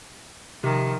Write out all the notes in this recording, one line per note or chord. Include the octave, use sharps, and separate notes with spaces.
C3 D#3 F3